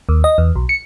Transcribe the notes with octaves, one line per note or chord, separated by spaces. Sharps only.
D#2
D#5
E2
B1
C#7